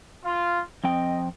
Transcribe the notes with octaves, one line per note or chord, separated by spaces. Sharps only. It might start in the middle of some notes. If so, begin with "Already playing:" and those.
F4
F2 C4 D#5 G5